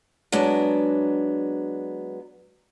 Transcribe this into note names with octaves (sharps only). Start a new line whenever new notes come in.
F#3 G#3 B3 D4